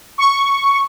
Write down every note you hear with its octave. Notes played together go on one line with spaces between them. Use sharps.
C#6